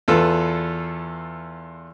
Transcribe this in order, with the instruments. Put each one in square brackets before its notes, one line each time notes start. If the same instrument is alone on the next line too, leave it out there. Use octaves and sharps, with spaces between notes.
[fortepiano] E2 F4 A4 B4